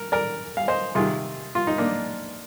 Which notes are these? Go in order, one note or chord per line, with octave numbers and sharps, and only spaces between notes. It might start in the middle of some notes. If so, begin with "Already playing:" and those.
Already playing: A#4
A#4 D5
F5
C5 D#5
C3 D#3 F4 G#4
F4
D#4
A#3 D4